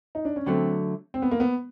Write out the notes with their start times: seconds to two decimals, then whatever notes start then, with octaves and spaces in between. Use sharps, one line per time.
0.15 D#4
0.25 D4
0.36 C#4
0.46 D3 F#3 A3 C4
1.14 C4
1.22 B3
1.31 A#3
1.40 B3